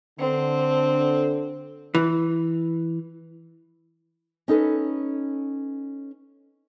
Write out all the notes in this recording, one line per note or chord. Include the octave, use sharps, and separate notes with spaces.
D3 C4
E3
C#4 D#4 A4 B4